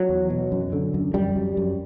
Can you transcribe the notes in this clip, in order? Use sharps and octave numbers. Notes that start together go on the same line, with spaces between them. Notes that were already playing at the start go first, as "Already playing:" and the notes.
Already playing: F#3
E2
B2
F#2
D3
F#2
F#2 G3
F#2
F#2